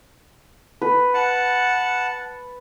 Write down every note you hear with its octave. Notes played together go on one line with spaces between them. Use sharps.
B4
F#5 A5